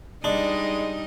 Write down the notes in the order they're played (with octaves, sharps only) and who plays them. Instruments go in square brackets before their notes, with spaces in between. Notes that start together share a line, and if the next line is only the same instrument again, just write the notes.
[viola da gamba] G3 D#4 D#5 [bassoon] G#3 [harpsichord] D4